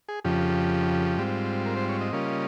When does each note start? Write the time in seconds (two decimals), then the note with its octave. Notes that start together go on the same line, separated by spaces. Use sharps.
0.09 G#4
0.25 F2 C#3 F3 G4
1.18 G#2 G3 C4 F4
1.66 A#4
1.77 C5
1.89 C#5
2.01 D#5
2.12 C#3 G3 A#3 C#4 F4